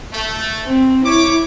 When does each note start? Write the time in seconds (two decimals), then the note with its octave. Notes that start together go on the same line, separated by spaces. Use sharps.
0.13 A3
0.65 C4
1.04 E4 C#5 D6